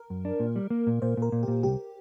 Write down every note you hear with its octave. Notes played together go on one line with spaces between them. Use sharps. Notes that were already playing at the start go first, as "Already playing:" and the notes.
Already playing: A#4
F#2
D4
A#2
G3
A#3
A#2
A#2 C5
A#2 A#4
A#2
A#2 G4
C2 G4